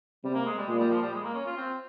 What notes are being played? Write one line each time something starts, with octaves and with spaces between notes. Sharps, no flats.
C3 G3
A#3
G#3
G3
A#2 G#3
G3
F3
G3
G#3
A#3
C#4
F4
C4